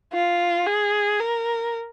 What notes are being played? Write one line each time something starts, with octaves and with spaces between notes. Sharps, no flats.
F4
G#4
A#4